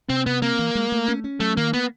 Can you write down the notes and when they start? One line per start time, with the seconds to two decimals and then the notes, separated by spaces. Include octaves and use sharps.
0.09 C3 C4
0.26 C3 B3
0.42 A#3 C4
0.59 E3
0.75 G#3
0.92 A3
1.08 C#4
1.24 C#4
1.40 F#3 A3
1.57 D#3 A#3
1.73 A#3 B3